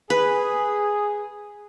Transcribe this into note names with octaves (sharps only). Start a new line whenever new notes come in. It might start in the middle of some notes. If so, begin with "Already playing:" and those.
G#4 B4